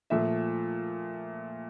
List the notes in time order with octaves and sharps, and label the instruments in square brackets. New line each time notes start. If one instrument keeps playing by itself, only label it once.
[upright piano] A#2 F3 A3 E5